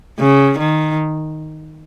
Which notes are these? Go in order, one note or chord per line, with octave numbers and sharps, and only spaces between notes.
C#3
D#3